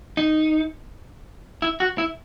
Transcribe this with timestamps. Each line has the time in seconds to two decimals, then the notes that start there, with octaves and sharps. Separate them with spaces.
0.17 D#4
1.62 E4
1.80 F#4
1.98 E4